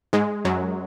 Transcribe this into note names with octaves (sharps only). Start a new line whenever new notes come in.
G#2 G#3
F#2 F#3